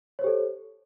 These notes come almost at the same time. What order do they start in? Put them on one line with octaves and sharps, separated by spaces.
C#5 C5 G4 A4